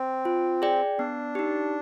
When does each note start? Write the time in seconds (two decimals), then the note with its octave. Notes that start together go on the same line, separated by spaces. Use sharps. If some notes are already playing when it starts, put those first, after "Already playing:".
Already playing: C4
0.25 F4
0.62 G#4 D5 G5
0.98 B3 D4
1.35 D#4 G4